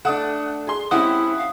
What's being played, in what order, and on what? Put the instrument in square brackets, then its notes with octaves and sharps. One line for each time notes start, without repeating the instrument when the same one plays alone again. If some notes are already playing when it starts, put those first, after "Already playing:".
[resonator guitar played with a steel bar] A3 D4 [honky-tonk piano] F#5 D#6
[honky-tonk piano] G#4 C6
[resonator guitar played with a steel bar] G#3 C4 G4 [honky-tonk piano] C#4 E5 F#5 [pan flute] E4 [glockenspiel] D#6
[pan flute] F5